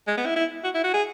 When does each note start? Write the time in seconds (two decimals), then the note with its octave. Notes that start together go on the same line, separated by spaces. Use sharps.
0.08 G#3
0.17 B3
0.26 E4
0.36 E4
0.64 F#4
0.75 E4
0.84 F#4
0.94 G#4